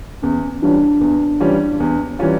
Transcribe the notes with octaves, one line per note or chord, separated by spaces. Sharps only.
E2 C#4
E3 G3 C#4 D4 F4
E2
E3 G3 C#4 F4
E2
E3 G3 C#4 F4